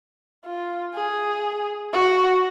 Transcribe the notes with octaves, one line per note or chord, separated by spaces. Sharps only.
F4
G#4
F#4